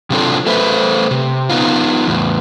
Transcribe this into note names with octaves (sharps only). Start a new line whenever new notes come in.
C3 F#3 C4 D4 F4 A4
A3 A4 B4 C5 E5
C3
B3 D#4 F4
E2 A2